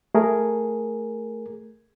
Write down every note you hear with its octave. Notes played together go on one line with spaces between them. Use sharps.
A3 G#4 A#4